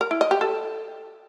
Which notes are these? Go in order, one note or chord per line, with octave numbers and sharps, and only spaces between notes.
A#4
E4
D#5
G4
A4